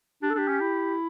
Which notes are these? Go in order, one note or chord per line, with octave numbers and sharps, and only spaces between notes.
D4 G4
A4
D4 G4
C#4
E4